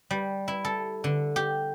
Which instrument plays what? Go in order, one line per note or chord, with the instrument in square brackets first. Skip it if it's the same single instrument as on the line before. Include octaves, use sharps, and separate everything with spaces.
[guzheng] G3
E4
A4
D3
G4